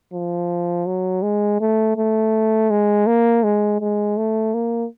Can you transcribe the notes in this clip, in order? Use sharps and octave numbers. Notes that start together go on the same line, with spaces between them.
F3
F#3
G#3
A3
A3
G#3
A#3
G#3
G#3
A3
A#3